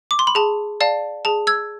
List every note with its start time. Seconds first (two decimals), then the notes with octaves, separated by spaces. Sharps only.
0.11 D6
0.19 C6
0.27 B5
0.35 G#4 A5
0.81 D5 F5 A5
1.25 G#4 A5
1.47 E6 G#6